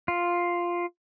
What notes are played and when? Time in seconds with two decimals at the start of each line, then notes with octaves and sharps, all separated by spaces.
0.08 F4